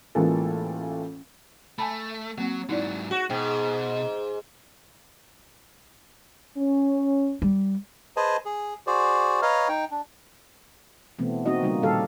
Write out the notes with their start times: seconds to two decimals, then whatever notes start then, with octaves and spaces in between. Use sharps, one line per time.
0.15 A1 E3 G#3 A#3 F4 A4
1.79 A3 G#5 A5 B5
2.38 F#3 A#3 C4
2.69 G#2 F#3 D#4 E4 D5
3.11 F#4
3.30 G#2 B2 G5
6.57 C#4
7.42 G3
8.17 G#4 B4 C5 D#5 G#5 A5
8.45 G#4
8.87 F#4 G#4 C5 D5
9.42 B4 C#5 D#5 F5 A#5 F6
9.69 D#4 G5
9.91 D4
11.19 B2 E3 A3 B3 C4
11.46 A#3 C4 D#4 F#4 D#5
11.62 C#3 G3 A#3 D#4 F4
11.82 A#2 D#3 G3 G4 A4 F5